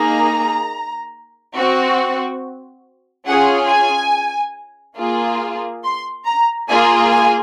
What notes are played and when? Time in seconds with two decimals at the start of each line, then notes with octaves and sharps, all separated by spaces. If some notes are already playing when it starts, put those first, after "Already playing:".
Already playing: A#3 D#4 G#4 A#5
1.56 C4 F#4
3.27 C#4 F4 G#4 F#5
3.69 G#5
4.98 A#3 F4 G#4
5.83 C6
6.26 A#5
6.68 A#3 F4 G#4 G#5
7.11 G#5